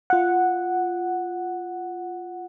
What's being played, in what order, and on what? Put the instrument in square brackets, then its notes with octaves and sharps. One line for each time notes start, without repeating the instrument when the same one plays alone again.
[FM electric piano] F4 F#5